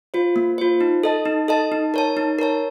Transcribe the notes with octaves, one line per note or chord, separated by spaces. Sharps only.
F4 C5
A#3
F4 C5
D#4
A4 D#5 A5
D#4
A4 D#5 A5
D#4
A#4 C#5 A5
D#4
A#4 C#5 A5